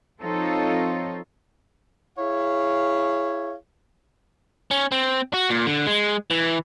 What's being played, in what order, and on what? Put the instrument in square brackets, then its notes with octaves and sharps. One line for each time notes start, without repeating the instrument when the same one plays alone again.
[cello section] F3 C4 D#4 F4 A4 C#5
[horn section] E4 G#4 C#5 F5
[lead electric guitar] C#4
C4
F#4
A#2
D3
G#3
E3